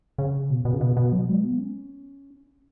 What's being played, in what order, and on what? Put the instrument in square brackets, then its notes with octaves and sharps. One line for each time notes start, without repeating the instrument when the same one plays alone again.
[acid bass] C#3
B2
B2
C#3
B2
B2
F#3
G#3
B3
C#4